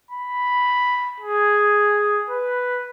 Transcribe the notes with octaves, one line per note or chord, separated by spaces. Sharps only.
B5
G#4
B4